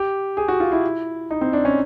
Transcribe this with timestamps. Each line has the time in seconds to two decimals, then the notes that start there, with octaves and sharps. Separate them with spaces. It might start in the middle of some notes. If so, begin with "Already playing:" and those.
Already playing: G4
0.37 G#4
0.48 F#4
0.60 F4
0.72 E4
1.31 D#4
1.41 C4
1.53 D4
1.65 C#4